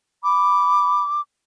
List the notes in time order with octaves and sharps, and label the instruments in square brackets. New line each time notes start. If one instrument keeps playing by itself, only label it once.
[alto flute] B5 [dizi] D6